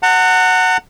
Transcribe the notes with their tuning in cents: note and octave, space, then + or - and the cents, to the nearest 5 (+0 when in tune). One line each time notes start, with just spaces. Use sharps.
F#5 +0 A#5 -45